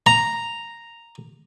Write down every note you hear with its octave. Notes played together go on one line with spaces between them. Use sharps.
A#5